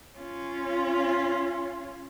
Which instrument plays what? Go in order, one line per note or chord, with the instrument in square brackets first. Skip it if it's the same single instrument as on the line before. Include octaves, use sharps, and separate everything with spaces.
[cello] C#4 F4